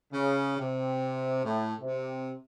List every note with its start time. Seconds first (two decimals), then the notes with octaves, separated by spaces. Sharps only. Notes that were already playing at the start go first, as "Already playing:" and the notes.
0.13 C#3
0.59 C3
1.43 A2
1.81 C3